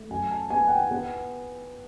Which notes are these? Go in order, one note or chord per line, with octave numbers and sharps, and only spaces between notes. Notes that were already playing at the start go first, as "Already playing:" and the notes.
Already playing: A3
F#2 G#5
A5
B3 G#5
F#5
G5
B3 F#5